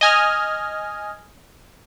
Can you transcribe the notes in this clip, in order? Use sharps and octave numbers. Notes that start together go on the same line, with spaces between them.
D#5 G#5 F6